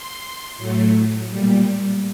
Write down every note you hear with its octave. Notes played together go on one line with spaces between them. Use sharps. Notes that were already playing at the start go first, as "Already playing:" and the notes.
Already playing: C6
A2 F#3 A3
A#2 G3